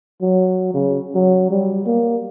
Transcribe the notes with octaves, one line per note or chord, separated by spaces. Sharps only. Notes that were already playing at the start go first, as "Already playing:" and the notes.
F#3
C#3
F#3
G3
A#3